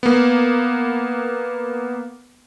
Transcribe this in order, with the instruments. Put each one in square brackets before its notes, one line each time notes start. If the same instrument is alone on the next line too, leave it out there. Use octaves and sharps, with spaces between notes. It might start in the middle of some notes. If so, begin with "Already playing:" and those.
[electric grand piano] A#3 B3